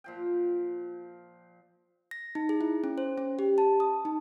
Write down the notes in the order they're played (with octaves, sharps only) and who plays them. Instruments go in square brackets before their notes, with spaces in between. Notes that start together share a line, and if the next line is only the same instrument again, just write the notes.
[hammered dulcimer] A#2 F3 G5
[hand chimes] A#6
D#4
G#4
E4
C#4
C5
C#4
G4
A5
D#6
D#4